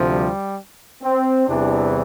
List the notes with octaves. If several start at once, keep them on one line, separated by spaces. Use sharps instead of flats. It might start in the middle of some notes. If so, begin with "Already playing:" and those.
Already playing: D2 C3 F3
G3
C4
E2 C3 E3 G3 D4